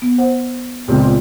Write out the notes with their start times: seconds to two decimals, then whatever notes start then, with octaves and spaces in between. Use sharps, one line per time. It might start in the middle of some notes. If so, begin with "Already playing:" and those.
0.02 B3
0.18 C5 F#5
0.88 C#2 A#2 B3 C4